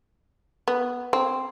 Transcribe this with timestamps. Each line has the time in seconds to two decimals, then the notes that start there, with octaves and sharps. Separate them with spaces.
0.68 B3
1.13 C4